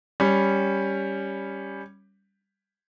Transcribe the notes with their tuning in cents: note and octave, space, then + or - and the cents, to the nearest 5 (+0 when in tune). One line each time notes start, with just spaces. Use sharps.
G3 +5 C#4 -5